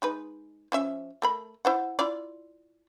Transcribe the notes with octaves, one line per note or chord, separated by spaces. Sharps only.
G#3 D#4 B4
F3 C#4 E5
A3 A#4 B5
E4 C5 F#5
E4 F4 D5